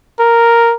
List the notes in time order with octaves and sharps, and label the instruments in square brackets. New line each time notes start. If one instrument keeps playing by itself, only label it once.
[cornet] A#4